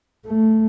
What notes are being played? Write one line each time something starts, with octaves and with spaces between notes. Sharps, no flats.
A3